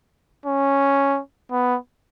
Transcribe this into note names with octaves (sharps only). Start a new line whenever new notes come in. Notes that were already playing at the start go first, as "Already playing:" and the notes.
C#4
B3